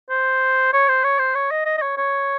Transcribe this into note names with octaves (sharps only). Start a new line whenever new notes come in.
C5
C#5
C5
C#5
C5
C#5
D#5
D#5
D#5
C#5
C#5